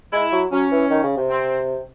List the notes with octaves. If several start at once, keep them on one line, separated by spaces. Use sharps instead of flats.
G#3 E4
F#3
F#3 C#4
E3
D#3
C#3
C3
C4